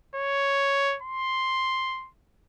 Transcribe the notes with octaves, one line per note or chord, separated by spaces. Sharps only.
C#5
C6